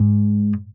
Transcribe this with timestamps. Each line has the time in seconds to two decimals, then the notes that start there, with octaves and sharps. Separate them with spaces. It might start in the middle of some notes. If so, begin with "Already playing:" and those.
Already playing: G#2